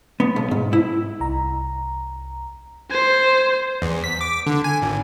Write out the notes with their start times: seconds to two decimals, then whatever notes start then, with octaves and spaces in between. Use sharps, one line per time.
0.20 B3
0.36 B1
0.51 G#2
0.73 E4
1.21 C2 A#5
2.91 C5 G#6
3.82 E2
4.04 B6
4.21 D6
4.46 D3
4.64 G#5
4.82 G#1